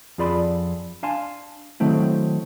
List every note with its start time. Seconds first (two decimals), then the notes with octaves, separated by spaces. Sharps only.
0.18 F2 F4 G#4 D5 B5 C6
1.03 D4 F5 G#5 A5 C6
1.80 D#3 F#3 A3 C4 E4